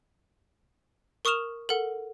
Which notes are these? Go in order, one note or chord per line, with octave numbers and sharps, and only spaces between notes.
A#4 C#6 D#6 F6 E7 F7
A4 A#4 F#5